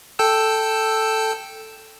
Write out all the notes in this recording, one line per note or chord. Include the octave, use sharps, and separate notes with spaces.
A4 G5 E6